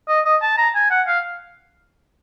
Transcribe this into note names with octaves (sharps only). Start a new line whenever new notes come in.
D#5
D#5
A5
A#5
G#5
F#5
F5